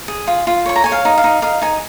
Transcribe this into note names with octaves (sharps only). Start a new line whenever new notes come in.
G#4
F4
F4
C#5 C#6
A#5
C#5 G#5
F5
D#4
F5
D#4
D#4 F5
D#4 G#5